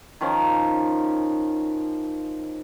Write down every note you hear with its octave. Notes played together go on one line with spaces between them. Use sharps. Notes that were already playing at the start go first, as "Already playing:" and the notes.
D#3 F3 C#4